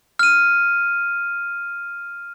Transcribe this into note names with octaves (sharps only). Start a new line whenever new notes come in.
F6 D#7